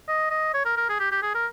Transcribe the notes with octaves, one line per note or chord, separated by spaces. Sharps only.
D#5
D#5
C#5
A#4
A#4
G#4
G4
G4
G#4
A#4